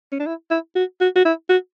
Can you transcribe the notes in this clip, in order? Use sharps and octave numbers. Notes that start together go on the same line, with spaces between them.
C#4
D4
E4
E4
F#4
F#4
F#4
E4
F#4